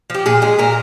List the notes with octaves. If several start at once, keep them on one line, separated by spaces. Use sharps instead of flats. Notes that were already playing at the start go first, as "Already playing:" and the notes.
F3 G4
A#2 G#4
G#3 G#4
A#2 A#4